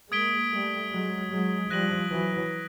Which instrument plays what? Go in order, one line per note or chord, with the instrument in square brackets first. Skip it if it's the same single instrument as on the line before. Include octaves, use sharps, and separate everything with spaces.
[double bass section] G#3 A#3 [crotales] D#6 G#6 B6 D7 G7
[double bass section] G3 A3
F#3 G#3
F#3 G#3
[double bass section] F3 G3 [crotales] F#6 A#6 D#7 F#7
[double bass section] E3 F#3